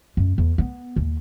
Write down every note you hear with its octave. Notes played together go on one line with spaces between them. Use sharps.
F#2
E2
B3
D#2